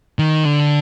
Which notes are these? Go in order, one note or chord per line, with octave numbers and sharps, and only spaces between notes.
D#3
D3